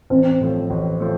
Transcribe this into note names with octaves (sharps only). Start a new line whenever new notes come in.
A1 C4
A2 F3 A3
A1
F3 A3